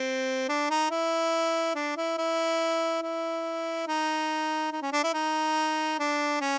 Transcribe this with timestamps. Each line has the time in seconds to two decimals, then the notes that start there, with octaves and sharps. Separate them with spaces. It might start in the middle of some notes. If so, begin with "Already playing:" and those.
Already playing: C4
0.48 D4
0.70 D#4
0.90 E4
1.75 D4
1.97 E4
2.18 E4
3.02 E4
3.87 D#4
4.72 D#4
4.82 C#4
4.92 D4
5.03 E4
5.13 D#4
5.99 D4
6.40 C#4